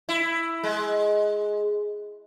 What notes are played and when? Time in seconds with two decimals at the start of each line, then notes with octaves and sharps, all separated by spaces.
0.09 E4
0.64 G#3